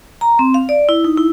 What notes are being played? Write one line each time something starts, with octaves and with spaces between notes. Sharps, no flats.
A#5
C4
F5
D5
E4
D#4
E4